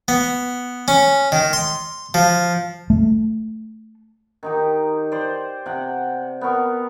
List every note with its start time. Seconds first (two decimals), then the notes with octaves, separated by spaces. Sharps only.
0.08 B3
0.88 C#4
1.32 D#3
1.53 C6
2.14 F3
2.90 A3
4.43 D#3 D#4 G4
5.12 C5 D5
5.66 C3 F#5 G5
6.41 B3 A#4 C#6